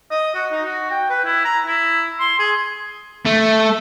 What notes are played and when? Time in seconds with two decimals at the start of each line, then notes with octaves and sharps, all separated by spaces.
0.11 D#5
0.35 F#4
0.52 D#4
0.65 F#4
0.91 G5
1.10 B4
1.25 E4
1.45 A#5
1.66 E4
2.20 C6
2.39 G#4
3.26 A3